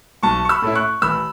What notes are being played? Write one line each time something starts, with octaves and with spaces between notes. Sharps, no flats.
B1 A5 C#6
C#6
B5 E6
A2 A3 C#4 E4
C#6 F#6
A1 B5 E6